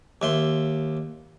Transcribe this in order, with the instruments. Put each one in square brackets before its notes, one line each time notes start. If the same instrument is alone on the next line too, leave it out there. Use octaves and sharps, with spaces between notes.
[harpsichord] D#2 E5 C6